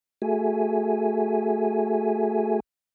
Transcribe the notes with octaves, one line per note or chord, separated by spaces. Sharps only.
A3 F#4 G#4 A4 E5 G#5